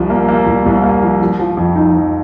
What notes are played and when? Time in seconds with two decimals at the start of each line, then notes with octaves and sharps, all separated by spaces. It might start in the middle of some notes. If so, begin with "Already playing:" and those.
Already playing: C2 F3
0.10 A#3
0.28 A#3
0.47 C2
0.66 C2
0.83 A#3
1.02 F3
1.21 F3
1.39 F3
1.57 F2
1.75 D#4
1.94 F2